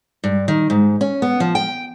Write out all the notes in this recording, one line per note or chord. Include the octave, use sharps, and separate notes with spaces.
G2
D#3
G#2
C#4
B3
F3
G5